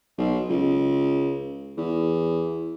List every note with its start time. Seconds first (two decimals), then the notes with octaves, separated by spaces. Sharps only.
0.18 B1
0.50 C#2
1.77 E2